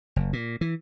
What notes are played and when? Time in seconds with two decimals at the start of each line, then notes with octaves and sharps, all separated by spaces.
0.16 F#1
0.33 A#2
0.61 E3